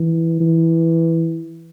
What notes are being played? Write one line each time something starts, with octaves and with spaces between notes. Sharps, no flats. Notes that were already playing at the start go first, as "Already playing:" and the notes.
Already playing: E3
E3